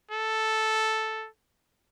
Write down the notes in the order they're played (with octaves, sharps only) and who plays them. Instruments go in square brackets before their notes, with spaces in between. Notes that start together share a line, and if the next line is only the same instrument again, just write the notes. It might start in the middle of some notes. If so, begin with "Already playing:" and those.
[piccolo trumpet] A4